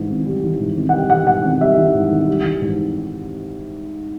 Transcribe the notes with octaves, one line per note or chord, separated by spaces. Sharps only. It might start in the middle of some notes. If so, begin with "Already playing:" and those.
Already playing: G#2 E3 G3
G#1
G3
E3
G#2
G#1
F#5
G3 G5
E3 F#5
G#2 F#5
G#1
G3 E5
E3
G#2
G#1
G3
E3
G#2